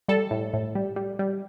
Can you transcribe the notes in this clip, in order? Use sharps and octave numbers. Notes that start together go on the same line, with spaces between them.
G3 A4
A2
A2
G3
G3
G3